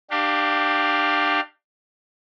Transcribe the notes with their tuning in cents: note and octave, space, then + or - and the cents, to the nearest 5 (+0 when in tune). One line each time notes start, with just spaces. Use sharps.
D4 +30 G4 -5 F5 +5